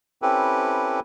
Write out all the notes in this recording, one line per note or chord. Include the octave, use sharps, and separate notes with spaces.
C4 C#4 E4 G4 A4 B4